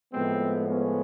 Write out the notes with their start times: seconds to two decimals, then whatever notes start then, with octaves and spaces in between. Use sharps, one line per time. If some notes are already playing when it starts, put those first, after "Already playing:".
0.12 A2 F3 G#3 B3 C4
0.67 B3 C#4